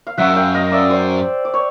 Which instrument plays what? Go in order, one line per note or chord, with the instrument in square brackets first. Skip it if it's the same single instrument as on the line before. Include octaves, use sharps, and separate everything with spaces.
[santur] F5
[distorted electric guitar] F#2 [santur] E5 F#5
[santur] F5 G5
D#5 F5
D5 E5
C5 D5
D5
C#5